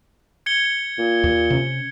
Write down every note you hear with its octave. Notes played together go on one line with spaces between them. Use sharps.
G#6 C#7 G7
A#2
D#2
C3 C#4